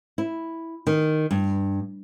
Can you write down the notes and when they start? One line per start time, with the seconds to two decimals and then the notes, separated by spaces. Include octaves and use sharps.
0.18 E4
0.87 D#3
1.31 G2